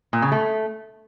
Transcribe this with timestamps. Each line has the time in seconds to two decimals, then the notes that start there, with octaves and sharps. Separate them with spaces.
0.13 A#2
0.22 C#3
0.32 A3